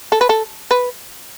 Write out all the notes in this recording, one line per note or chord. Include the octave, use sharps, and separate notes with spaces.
A4
B4
A4
B4